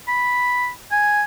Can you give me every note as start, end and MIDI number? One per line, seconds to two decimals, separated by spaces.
0.08 0.70 83
0.92 1.23 80